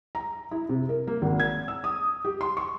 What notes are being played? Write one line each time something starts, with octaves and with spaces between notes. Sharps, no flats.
A#5
E4
C3
A#4
A#3
G#1
G#6
E6
D#6
G4
C6
C#6